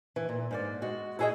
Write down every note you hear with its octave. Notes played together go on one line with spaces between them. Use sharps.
E3
A#2
G#2 A#3 D5
G#3 F#4
E4 F#4 G#4 C5 D#5